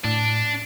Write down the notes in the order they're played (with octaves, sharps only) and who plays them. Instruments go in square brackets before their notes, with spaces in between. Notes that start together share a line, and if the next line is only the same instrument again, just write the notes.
[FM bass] A2 [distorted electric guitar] D4